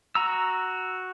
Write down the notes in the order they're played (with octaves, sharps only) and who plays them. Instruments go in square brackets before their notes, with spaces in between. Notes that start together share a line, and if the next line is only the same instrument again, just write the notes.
[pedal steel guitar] F#4 A#5 E6